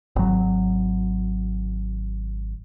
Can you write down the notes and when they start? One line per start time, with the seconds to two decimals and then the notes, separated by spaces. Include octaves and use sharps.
0.16 G#1 F#3